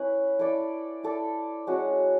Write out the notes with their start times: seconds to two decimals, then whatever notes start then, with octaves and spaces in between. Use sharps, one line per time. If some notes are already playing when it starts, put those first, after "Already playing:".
Already playing: C#4 E4 B4
0.39 E4 A4 D5
1.03 E4 A4 D5
1.67 G#3 C#4 F#4